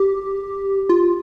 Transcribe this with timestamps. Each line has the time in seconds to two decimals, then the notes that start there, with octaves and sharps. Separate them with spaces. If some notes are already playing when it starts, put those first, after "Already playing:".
Already playing: G4
0.89 F4